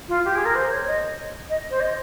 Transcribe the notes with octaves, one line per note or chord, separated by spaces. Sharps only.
F4
G4
G#4
A#4
C5
C#5
D#5
D#5
C5
D#5